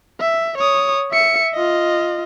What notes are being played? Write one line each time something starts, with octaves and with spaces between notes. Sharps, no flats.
E5
C#5 D#6
E5 C#7
F4 D#5